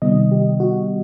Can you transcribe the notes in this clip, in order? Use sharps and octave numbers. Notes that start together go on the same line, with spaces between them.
C3 D#3 G3 B3 D#5
G4
F#4